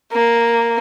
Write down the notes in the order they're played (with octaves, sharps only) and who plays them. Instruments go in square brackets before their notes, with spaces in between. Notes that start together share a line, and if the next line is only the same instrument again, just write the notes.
[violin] A#3